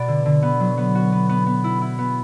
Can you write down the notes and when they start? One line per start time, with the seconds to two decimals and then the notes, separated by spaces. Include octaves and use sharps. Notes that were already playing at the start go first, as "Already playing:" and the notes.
Already playing: B2 B3 D5
0.08 D3
0.26 D3
0.42 B3
0.60 F#3
0.78 B3
0.95 F#4
1.12 B3
1.29 B3
1.47 B3
1.64 E4
1.81 E4
1.99 B3